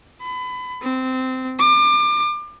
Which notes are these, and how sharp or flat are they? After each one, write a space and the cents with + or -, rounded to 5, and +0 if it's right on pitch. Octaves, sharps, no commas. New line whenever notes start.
B5 +30
C4 -15
D6 +30